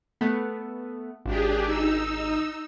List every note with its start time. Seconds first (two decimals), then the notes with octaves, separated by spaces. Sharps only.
0.21 A3 B3
1.26 G#1 D4 G4 G#4
1.66 D#4 E6